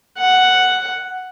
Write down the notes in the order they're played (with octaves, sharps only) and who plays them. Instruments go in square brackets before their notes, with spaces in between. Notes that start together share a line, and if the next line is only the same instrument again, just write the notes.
[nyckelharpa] F#5